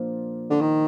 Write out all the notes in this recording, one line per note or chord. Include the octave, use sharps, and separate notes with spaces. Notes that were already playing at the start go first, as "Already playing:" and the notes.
Already playing: A#2 F3 A#3 D4
D3
D#3